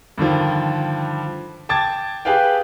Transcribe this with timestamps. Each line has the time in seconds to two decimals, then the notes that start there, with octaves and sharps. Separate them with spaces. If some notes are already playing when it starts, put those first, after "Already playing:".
0.18 G2 D3 D#3 F3
1.69 G5 A5 D6 G#6 A6
2.25 G4 G#4 B4 F5 G5